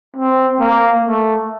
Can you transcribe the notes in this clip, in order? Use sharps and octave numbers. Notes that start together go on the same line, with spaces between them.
C4
A#3
A3